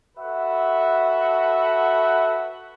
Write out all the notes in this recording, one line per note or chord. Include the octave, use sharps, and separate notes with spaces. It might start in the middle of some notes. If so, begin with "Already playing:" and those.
F#4 A4 B4 E5 F#5